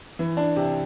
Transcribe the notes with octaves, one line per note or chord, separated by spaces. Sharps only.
E3
D4
C3